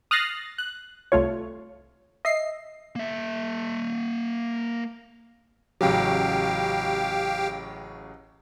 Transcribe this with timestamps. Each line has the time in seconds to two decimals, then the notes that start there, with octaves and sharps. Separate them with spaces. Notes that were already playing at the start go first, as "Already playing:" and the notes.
0.11 D#6 F6 F#6 A6 A#6 C7
0.58 F#6
1.12 C2 A3 F4 C#5
2.25 D#5 E5 C7
2.96 A#3 E5
5.81 A1 C#3 F#3 G4 F5 G5